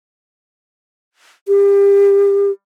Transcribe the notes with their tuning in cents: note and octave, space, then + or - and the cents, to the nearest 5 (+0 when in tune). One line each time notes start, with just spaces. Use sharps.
G4 +30